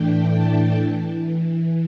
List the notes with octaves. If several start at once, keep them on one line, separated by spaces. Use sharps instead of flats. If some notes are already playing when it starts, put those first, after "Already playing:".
Already playing: A2 E3 A3 D4 G5
A5
E3